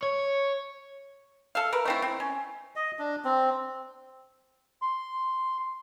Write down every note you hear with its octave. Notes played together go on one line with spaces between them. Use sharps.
C#5
A4 E5 F5
A#4 B4
A3 C4 E4
C4
C#4
D#5
D4
C4
C6